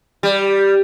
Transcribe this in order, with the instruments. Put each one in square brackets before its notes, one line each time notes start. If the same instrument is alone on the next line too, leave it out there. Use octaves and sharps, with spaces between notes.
[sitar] G3